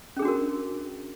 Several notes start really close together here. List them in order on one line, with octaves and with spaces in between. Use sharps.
C#4 G#4 D4 F#4 A#4